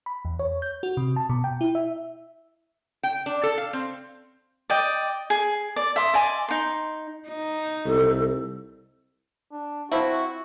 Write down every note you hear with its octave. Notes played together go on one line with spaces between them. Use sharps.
B5
E2
C#5
G6
F#4
C3
A5
B2
G5
E4
E5
G5
D4
A4
F5
C4
D5 D#5 G5
G#4
D5
E5 C6 D#6
D5 D#5 G#5 C6
D#4 C6
D#4
C2 A4
D4
F3 C4 E4 F#4